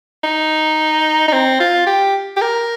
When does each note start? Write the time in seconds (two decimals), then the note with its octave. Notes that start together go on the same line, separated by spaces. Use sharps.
0.24 D#4
1.28 D#4
1.33 C4
1.60 F4
1.87 G4
2.36 G4
2.41 A#4